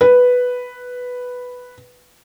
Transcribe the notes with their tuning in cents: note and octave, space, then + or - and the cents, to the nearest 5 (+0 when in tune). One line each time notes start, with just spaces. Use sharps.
B4 +0